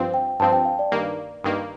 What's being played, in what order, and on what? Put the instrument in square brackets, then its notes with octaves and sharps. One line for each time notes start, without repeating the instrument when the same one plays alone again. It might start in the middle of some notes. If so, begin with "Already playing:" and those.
Already playing: [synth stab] G2 F3 C4 [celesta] F5
[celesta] G5
[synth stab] G2 F3 C4 [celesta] A5
[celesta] G5
F5
D5
[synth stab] G2 D#3 A#3
G2 D#3 A#3